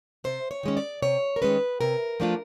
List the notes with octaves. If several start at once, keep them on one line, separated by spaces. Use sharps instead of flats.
C3 C5
C#5
D#3 G#3 C#4
D5
C3 C#5
A#4
D#3 G#3 C#4 B4
C3 A#4
F3 A3 D4 F4